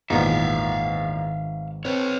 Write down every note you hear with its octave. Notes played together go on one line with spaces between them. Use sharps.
G#1 E2 A#2 B3 D#4 E5 F5
C4 B4 C#5